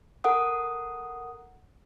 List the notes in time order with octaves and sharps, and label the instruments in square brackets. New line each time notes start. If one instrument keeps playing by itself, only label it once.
[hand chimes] A4 A#4 F#5 D#6